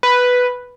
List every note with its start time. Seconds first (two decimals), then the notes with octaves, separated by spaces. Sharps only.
0.03 B4